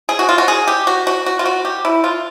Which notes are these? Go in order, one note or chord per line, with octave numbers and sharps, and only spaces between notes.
G#4
F#4
F4
F#4
G#4
G4
F#4
F#4
F#4
F4
F#4
G4
E4
F4